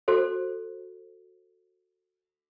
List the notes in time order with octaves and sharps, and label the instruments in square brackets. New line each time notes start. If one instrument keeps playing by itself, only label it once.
[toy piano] F#4 A4 C5